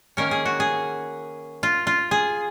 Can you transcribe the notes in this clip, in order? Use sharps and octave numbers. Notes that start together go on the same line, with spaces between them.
D#3 A#3 C#4 A#4
G#4
F#4
G#4
F4
F4
G#4